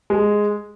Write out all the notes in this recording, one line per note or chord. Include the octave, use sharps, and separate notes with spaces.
G#3